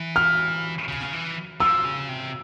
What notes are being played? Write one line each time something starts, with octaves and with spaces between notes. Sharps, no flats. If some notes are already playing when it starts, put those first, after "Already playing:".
Already playing: E3
F6
C#3
E3
F3 E6
C#3
C3